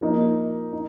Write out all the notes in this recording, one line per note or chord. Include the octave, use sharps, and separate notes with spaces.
F3 A#3 D#4
D#4